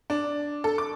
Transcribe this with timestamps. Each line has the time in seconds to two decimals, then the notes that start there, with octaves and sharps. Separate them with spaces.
0.10 D4
0.64 A4
0.78 D6